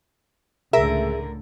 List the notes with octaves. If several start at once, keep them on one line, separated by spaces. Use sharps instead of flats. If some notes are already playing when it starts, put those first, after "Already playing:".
C#2 A2 D3 G#4 A#4 E5